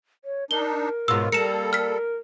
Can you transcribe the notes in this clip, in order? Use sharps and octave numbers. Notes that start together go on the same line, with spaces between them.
C#5
D4 D#4 A#4 G7
G#2 B2 F#3 B3 F4 E6
G3 A#3 A4 C#7 E7
A#4 F6 B6